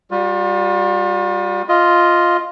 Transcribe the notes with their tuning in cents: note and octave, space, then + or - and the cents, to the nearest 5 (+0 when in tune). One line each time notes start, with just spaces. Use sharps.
G3 +0 F4 +40
F4 +0 D#5 +5